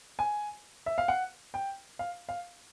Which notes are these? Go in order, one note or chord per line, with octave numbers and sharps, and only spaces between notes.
G#5
E5
F5
F#5
G5
F5
F5